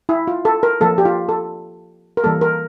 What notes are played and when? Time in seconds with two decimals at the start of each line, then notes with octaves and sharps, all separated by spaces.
0.09 E4
0.28 F4
0.45 A4
0.63 A#4
0.81 F3 A#3 A4
0.98 G4
1.05 F4
1.29 A4
2.17 A#4
2.24 E3 G3 A#3 A4
2.41 A#4